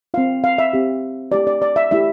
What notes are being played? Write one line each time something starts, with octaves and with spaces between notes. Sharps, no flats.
C4 F4 F5
F5
E5
C4 G4
A3 E4 G4 D5
D5
D5
E5
A3 E4 G4 E5